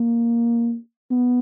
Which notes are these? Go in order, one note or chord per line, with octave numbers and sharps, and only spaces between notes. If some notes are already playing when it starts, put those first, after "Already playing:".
Already playing: A#3
B3